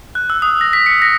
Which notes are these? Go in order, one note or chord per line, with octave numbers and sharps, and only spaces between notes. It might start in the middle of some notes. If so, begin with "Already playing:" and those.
F#6
E6
D#6
A#6
B6
C#7
A#6